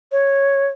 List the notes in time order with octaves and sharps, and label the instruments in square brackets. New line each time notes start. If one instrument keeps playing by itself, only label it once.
[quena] C#5